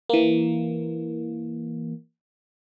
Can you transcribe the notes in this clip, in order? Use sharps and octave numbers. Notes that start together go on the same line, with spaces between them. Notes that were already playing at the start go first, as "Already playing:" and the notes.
E3 A#3